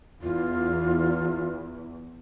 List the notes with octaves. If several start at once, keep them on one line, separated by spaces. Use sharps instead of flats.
E2 F4